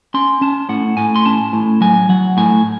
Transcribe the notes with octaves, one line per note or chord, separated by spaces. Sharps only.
C#4 C6
C#4 A5
A2 F#5
A2 G#5
C6
C#4 A5
A2
F#3 G#5
F#3 F#5
A2 G#5